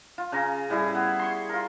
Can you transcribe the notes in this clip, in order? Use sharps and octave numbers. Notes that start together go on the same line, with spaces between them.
F4
C#3 C#4 A#5
A2 G3 E4 G#4
B3
C6 C#6
F4 A#4